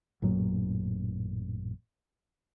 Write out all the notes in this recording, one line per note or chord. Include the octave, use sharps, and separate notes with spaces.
A1 F#2 A#2 F#3